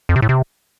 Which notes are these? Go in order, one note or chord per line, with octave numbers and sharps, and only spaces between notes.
F2
C3
A2
C3